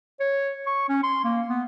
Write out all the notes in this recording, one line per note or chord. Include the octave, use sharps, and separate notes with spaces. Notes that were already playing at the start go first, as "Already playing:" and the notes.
C#5
C#6
C#4
C6
A#3
B3